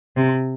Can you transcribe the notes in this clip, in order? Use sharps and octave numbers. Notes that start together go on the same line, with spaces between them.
C3